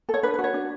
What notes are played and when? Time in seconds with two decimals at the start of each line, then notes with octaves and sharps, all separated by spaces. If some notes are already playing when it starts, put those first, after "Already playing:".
0.09 A4
0.14 C#5
0.23 D4 B4
0.34 B4
0.39 F#4
0.44 C#5
0.54 D4